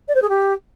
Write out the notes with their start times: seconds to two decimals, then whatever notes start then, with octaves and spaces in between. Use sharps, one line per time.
0.08 D5
0.15 C5
0.22 G#4
0.29 G4